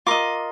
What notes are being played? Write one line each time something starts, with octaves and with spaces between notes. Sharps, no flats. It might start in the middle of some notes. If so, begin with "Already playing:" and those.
F4 A#4 D#5 D6